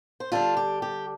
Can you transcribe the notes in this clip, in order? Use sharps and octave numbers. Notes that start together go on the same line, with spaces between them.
C5
D3 G3 D4 F4 A4
G4
G4